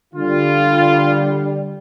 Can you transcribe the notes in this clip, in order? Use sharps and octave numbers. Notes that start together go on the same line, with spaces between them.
D3 G3 F4